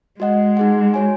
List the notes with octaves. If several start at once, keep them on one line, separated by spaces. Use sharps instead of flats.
G#3 F#4 D#5 F#5
D#4 G#4 F#5
F#4 C#5 G#5